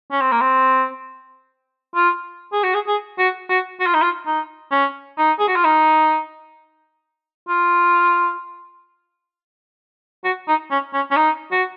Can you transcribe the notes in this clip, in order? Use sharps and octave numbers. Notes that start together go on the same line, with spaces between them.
C#4
C4
A#3
C4
F4
G#4
F#4
G#4
G#4
F#4
F#4
F#4
F4
D#4
F4
D#4
C#4
D#4
G#4
F#4
F4
D#4
F4
F#4
D#4
C#4
C#4
C#4
D#4
F#4